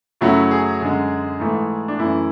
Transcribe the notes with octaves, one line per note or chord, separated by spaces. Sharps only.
F#2 C#3 F#3 A3 E4
G#4
F#2 D3 G#3
G#2 E3 A3
D4
F#2 E3 A3 E4